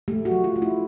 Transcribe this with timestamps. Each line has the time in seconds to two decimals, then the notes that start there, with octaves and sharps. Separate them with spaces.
0.08 A3 G4
0.25 F#4
0.31 F#3
0.44 F4
0.56 A3
0.62 E4